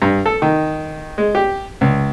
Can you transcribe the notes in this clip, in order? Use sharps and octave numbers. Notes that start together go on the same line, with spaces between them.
G2
A4
D#3
G#3
G4
C#2